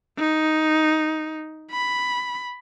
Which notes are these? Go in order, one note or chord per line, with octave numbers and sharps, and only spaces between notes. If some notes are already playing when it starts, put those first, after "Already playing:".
D#4
B5